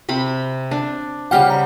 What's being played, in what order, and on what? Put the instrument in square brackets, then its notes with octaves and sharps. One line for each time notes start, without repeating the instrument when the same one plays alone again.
[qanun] C3 C4 B5
D4
[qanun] C#3 G3 C5 [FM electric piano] F#5 G5 F6
[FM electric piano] A#5